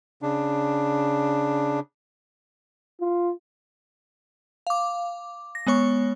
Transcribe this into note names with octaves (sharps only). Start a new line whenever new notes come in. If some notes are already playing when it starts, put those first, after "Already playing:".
C#3 D4
F4
F5 D6
A#6
G#3 B3 C#5 C#6